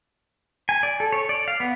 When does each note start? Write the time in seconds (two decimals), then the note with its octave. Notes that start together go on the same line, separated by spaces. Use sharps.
0.69 G#5
0.83 D5
1.00 A4
1.12 C#5
1.29 D5
1.48 F5
1.60 B3